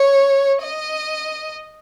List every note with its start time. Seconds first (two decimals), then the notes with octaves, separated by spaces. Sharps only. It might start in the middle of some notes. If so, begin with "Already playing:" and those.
Already playing: C#5
0.62 D#5